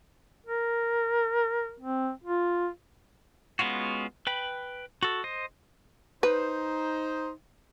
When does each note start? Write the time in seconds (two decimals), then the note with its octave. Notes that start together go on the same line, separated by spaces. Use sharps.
0.46 A#4
1.80 C4
2.24 F4
3.59 G#3 B3 C#4 F4 F#4
4.27 B4 G5 B5
5.03 F#4 A4
5.24 C5 D#5
6.23 D#4 B4 C5